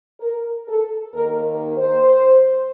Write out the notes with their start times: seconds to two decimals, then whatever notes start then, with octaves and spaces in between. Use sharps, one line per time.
0.20 A#4
0.68 A4
1.14 D#2 D#3 A#3 A#4
1.46 A#4
1.77 C5